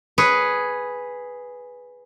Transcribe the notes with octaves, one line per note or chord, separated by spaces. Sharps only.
G#4 B4 C#5